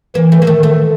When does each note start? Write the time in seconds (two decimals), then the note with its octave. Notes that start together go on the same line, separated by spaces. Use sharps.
0.15 E3 A#3
0.32 A3
0.42 A#3
0.47 D#3 A3
0.63 A3